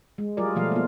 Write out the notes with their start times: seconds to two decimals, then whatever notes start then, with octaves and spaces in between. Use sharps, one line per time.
0.18 G#3
0.37 F#3 G3 F4 G#4 A#4 D5
0.55 B2 F3 A3 F5
0.72 A#3 B3 F4